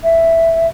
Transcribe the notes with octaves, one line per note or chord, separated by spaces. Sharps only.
E5